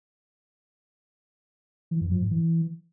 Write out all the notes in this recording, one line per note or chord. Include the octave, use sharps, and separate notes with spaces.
E3
F#2
F3
G#2
E3